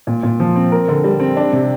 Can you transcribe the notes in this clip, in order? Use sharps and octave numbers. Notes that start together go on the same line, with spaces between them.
A#2
A#2
F3
C4
A#4
D3
G3
C4
D4
C3